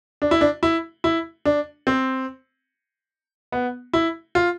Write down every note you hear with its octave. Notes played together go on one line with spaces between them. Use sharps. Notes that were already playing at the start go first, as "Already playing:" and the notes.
D4
E4
D4
E4
E4
D4
C4
B3
E4
F4